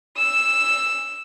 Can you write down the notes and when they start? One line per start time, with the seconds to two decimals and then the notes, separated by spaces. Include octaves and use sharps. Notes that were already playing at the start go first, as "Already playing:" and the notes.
0.18 E6 E7